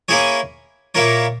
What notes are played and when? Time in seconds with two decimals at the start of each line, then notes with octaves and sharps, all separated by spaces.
0.08 A#3 C#4 E4 G#4 C#5
0.95 A#2 A#3 E4 A#4 C#5